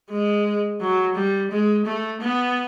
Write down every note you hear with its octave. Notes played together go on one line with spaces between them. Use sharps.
G#3
F#3
G3
G#3
A3
B3